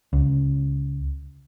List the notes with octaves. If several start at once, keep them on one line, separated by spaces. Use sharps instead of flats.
C#2